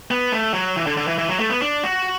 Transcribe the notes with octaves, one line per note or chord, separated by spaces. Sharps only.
B3
A3
F#3
E3
D3
D3
E3
E3
F#3
A3
B3
D4
F#4